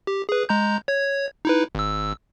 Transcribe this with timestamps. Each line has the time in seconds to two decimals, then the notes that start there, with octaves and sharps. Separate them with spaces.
0.07 G4
0.29 G#4 B4
0.49 G#3 A#5 G6
0.88 C#5 G#6
1.45 D#4 E4 B4
1.75 G#1 E6